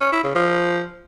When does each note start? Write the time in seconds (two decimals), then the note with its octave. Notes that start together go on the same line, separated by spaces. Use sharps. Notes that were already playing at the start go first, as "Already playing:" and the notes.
0.01 C#4
0.12 E4
0.24 C#3
0.35 F3